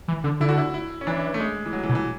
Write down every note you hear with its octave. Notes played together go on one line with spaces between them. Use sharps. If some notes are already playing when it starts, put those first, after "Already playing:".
E3
D3
D3 E4
F#4
E4
E4
C#4
E3 D4
A3
G#3
E3
F#3
E3
B2
E3